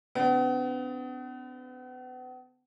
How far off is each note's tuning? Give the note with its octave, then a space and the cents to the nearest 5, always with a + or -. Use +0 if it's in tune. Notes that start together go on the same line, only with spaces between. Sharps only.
D3 -25 B3 +40